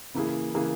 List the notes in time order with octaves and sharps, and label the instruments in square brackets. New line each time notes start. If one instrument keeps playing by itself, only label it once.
[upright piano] C#3 E3 A#3 E4 G#4
C#3 E3 A#3 E4 G#4